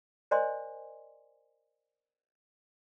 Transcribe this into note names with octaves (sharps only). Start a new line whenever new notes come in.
A#4 C5 D5 D#5 G#5 C6